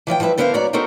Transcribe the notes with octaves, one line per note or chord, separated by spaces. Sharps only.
E3 F3 D5 G5
F3 G3 E4 B4 E5
D3 B3 A#4 C5 E5 F5
G#2 B3 F#4 C#5 D5 A#5
B3 D#4 F#4 A4 A#4 C5